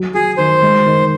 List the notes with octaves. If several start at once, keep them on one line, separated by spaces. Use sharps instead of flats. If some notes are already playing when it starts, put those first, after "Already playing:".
Already playing: F#3
F#4 G#4
D#3 C5
G#3
D#3